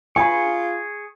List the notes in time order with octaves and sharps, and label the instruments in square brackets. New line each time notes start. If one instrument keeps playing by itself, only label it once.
[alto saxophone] F4 [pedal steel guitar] G#4 C#6 [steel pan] G#5 B5